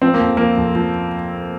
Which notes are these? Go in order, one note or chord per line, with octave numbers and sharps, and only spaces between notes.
F3 C4
A#3
F2
F3 A#3
F2
F3